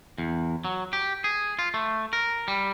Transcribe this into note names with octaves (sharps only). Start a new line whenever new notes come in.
E2
F#3
G4
G#4
F4
A3
A#4
G3